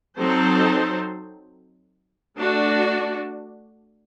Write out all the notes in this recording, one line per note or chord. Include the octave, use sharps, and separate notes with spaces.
F#3 C4 D#4 A4 C5
A3 D4 F#4